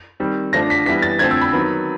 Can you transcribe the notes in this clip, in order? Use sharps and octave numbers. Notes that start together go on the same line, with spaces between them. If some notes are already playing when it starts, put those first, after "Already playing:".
D#3 G3 C4
D3 F3 A3 D4 A#6
B6
E3 G3 B3 E4 B6
A6
D3 F3 A3 C4 G#6
E6
B5
D#3 F#3 B3